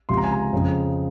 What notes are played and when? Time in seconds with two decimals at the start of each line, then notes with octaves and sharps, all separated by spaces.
0.09 C#2 C3 F3 C6
0.17 A#5
0.24 G#5
0.31 A#5
0.53 F2 C#3 F3